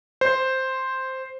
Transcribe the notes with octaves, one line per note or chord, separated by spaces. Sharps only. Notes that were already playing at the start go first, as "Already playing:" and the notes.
C5